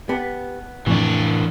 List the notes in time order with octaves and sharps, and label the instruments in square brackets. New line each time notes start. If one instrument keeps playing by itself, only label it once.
[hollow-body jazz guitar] B3 [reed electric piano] G4 B4 A5
[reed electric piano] F2 C#6 [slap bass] A2 C3 D#3 [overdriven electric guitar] E3 D4